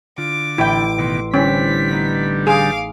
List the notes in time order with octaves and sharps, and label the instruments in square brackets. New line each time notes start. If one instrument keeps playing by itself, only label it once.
[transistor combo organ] D3 [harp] F4 [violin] D6
[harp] A1 [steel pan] E4 G5
[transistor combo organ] B2 D#3 [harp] C6 E6 C#7
[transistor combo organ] D3 G3 [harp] C4 E4 [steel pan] C#4 [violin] B6
[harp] B3 D#4
[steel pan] G#4 [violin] F5 D6